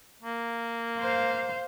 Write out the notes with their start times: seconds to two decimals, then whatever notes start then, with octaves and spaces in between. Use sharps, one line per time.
0.22 A#3
0.98 C5 F5